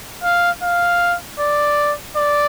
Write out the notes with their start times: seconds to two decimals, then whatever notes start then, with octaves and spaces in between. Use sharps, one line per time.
0.23 F5
0.63 F5
1.40 D5
2.17 D5